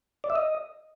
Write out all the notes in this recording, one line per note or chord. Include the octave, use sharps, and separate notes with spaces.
D5
E5
D#5